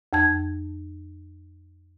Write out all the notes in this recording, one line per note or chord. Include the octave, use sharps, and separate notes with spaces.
F2 A5 G#6